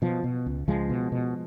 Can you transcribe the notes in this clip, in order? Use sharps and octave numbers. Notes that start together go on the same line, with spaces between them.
B2 F3
B2
C#2
C#2 F3 G#3
B2
B2